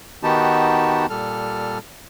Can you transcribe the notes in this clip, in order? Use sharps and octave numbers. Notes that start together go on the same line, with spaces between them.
D#3 B3 D#4 F#4 G4 A5
A#2 G3 A4 F6